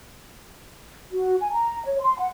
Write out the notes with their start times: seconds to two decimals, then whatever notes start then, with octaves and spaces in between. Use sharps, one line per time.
1.13 F#4
1.40 G#5
1.53 A#5
1.85 C#5
2.00 C6
2.18 F#5